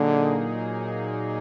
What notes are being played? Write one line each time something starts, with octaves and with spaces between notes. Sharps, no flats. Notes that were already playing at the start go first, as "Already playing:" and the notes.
Already playing: A#2 D3 F#3 A#3 D#4 G#4